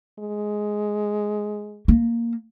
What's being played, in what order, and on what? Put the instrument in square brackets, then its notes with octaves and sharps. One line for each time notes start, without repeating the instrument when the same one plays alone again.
[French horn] G#3
[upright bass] A#3